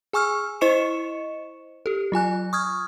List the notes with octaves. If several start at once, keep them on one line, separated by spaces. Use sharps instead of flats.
G#4 G#5 C#6 E6 F6
E4 C5 D#5 C#6 C#7 E7
G4 A4
F#3 F4 G#5 F#6
C#6 D#6 F6 G#6